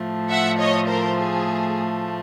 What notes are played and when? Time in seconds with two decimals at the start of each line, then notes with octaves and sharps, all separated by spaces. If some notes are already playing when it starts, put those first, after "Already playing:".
Already playing: A2 F3 A3
0.30 E5 F#5
0.59 C#5 D#5
0.88 A#4 C5
1.17 G#4